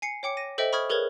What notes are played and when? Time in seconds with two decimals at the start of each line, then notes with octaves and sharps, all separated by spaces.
0.02 G#5 C7 C#7
0.23 C#5 G5 D6 C#7
0.37 A#6 D#7
0.58 A4 C5 D#5 E5 G5
0.73 B5 C#6 D#6 F6 G#6
0.90 G#4 A#4 B4 C#5 G#6